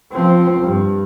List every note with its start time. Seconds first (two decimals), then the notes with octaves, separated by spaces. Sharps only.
0.12 F3 C4
0.61 G2